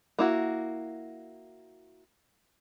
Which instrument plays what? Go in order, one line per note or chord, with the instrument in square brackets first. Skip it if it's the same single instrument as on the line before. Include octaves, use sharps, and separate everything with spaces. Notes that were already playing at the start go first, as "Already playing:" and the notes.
[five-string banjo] A#3 E4 F#4